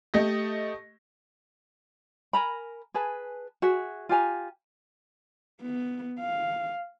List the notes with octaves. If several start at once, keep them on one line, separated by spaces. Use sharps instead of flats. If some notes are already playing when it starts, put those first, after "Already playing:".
A3 G4 D#5 A#6
A#4 G#5 A#5 B5
G#4 B4 G#5 A5
F#4 G#4 E5
F4 G4 G#5 A#5
B3
F5